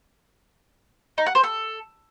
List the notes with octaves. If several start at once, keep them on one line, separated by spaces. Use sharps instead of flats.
D#4
F#5
C5
A4